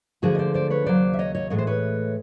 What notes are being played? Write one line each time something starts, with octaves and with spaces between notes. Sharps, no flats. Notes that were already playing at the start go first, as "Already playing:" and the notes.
D2 D3 F3 G#3 F#4 G#4
D#5
C5 D5
C5 D5
B4 C#5
D#2 C#3 F#3 C5 D5
E5
C#5 D#5
C#5 D#5
A2 E3 G#3 C#5
C5
B4 C#5